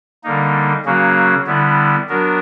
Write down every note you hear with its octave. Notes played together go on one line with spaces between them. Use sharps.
D3 G3 A#3 D#4
C#3 F#3 A#3 C#4 F#4
D3 G3 B3 E4
F#3 B3 D4 F#4 A#4